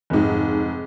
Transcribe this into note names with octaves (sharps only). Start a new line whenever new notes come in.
F1 G#2